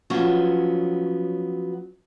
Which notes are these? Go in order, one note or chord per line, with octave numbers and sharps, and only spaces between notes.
F3 F#3 B3 C#4